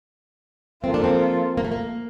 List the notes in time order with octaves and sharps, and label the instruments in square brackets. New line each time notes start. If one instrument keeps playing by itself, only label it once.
[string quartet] F3 A#3 F4 A4 [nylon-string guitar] C4
[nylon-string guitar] D4
C4
A#3
A3
A#3